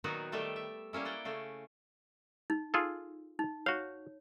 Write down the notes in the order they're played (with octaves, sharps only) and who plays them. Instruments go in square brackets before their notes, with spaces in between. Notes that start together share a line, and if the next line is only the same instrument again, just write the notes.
[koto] A#2 D#3 F#3 B3 D#4 F#4
D#3 G3 A3 E5 G5 A5
E5
G3 A#3 C#4 E4
D5 F#5 G5
C#3 A3 C#4
[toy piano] D#4
[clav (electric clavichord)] F4 G#4 A4
[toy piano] D#4
[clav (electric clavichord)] F#4 F5 [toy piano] C#5